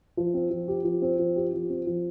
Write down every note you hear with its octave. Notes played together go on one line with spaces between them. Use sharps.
F3
C4
F3
G4
F3
C4
F3
G4
F3
C4
F3